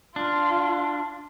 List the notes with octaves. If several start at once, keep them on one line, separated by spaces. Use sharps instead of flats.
D4 F4